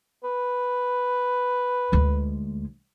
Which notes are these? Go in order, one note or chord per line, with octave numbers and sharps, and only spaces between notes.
B4
D2 G#3